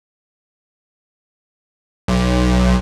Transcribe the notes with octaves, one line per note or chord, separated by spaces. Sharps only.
B1